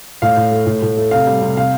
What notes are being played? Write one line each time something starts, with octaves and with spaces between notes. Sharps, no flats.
A2 F5
A2
A3
A2
A2
A3
C3 F5
G3
C3
C3 F5